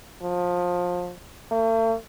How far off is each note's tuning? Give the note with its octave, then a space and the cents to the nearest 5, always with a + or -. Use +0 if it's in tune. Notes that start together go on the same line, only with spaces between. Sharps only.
F3 +25
A3 +45